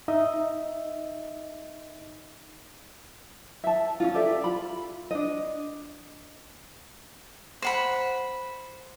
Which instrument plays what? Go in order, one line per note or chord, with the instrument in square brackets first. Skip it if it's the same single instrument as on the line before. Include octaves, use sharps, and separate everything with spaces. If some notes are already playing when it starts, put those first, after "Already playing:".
[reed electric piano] D#4 D#5 E5
[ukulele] E5 A5
C#4 D#4 F4
G4 A4 D5 E5
F4 B5
D4 D#5
[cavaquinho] C5 F#5 B5